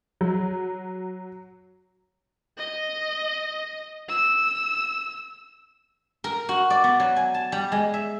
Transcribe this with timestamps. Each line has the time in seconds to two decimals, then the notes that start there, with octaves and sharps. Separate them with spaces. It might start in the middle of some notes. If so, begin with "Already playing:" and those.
0.21 F#3
2.58 D#5
4.09 E6
6.24 A#4
6.49 F#4
6.70 D5
6.84 B3
7.00 F#3
7.16 G#5
7.34 A5
7.52 G3
7.72 G#3
7.94 E5